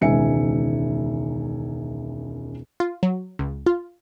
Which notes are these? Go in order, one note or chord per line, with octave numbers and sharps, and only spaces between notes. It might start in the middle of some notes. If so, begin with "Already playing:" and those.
E1 C#2 D#3 E5 G#5 C#7
F4
F#3
C#2
F4